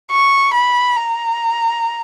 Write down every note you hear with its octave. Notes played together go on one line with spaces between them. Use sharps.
C#6
B5
A#5